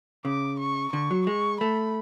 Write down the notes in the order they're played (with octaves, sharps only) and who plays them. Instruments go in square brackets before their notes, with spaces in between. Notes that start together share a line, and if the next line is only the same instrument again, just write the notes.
[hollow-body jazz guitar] C#3 [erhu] D6
[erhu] C#6
[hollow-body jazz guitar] D3 [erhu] C#6
[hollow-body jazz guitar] F#3
[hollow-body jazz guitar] G#3 [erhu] C#6
[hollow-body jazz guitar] A3 [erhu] B5